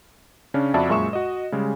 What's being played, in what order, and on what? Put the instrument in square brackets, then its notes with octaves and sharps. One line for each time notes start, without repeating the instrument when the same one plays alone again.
[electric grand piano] C#3 C#4 D4
F2 F#4 D5 E5 A5 B5
F#2 A#2 G#3 E5 C#6 E7
F#4 D#5
C#3 G3 G#3